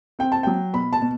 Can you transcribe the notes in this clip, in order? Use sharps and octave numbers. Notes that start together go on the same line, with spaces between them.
C4 G5
A5
F#3 G5
B2 B5
A5
B2